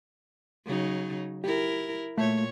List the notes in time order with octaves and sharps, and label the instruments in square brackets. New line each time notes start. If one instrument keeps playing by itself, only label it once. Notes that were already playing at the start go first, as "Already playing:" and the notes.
[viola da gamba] C#3 F#3 D#4
[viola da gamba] E4 A#4 [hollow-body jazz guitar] G4
[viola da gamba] A#2 C#5 [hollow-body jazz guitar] A3 E5